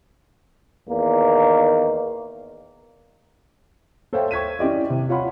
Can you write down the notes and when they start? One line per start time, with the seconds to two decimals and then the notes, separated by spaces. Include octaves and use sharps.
0.89 E2 D#3 A#3
4.13 A4 C5 C#5 E5 F5 G5
4.31 C#6 G#6 B6 D#7
4.59 C#4 E4 G4 D5 D#5
4.90 C3
5.09 F4 C#5 F5 F#5 B5